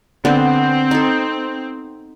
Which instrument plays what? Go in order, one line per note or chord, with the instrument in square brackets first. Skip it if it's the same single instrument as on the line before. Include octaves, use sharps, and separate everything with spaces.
[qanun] D3 B3 D4 [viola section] C4
[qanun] D#4 A4